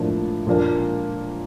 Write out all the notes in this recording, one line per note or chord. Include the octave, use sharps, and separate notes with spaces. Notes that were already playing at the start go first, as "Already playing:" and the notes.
Already playing: A2 F3 A#3 D4
A#2 F3 A#3 D4